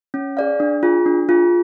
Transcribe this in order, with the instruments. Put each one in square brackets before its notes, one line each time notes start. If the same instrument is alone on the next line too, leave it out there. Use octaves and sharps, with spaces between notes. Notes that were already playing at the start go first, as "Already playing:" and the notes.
[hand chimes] C#4
G#4 D5 F5
D4
F4 G#4
D4
F4 G#4